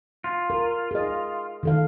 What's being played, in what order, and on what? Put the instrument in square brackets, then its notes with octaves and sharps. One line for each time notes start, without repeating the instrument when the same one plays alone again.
[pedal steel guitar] F4
[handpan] A#4
G#4 D#5
D#3 A4 F5